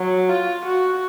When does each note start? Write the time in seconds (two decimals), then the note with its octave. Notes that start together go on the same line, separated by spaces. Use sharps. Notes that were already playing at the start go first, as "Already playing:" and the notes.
Already playing: F#3
0.29 F4
0.66 F#4